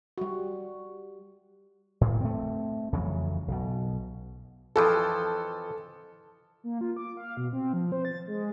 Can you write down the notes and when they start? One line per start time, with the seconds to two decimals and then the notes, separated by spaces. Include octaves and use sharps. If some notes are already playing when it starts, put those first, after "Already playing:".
0.18 G3 F#4
2.01 A2
2.21 A3 C4
2.93 F2 C#3 E3 F#3
3.48 B1 B2
4.76 F2 E3 F3 A4
6.64 A#3
6.81 F4
6.97 D6
7.17 F5
7.37 B2
7.53 C4
7.73 F3
7.92 C5
8.05 A6
8.27 G#3